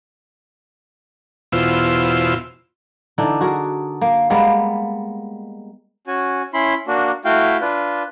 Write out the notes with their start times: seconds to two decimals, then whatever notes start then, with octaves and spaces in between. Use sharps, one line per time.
1.52 E2 B2 F4 C5 E6
3.18 D3 E3 D4 D#4
3.41 F#4 G#4 A#4
4.01 A#3
4.30 G3 G#3 A#3 B3
6.07 C#4 F#4 G#5
6.54 C#4 E4 B5 C6
6.87 A#3 D4 F#4
7.25 A3 E4 F#4 F5 G5
7.61 D4 F4 B4